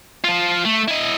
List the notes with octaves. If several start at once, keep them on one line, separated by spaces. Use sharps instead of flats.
F3 F4
A3
E4 D#5